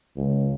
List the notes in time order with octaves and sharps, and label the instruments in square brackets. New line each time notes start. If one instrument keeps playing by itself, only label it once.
[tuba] C#2